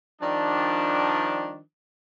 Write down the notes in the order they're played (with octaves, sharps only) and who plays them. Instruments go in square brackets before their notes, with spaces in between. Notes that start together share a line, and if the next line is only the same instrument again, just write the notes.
[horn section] D#3 F3 G3 D4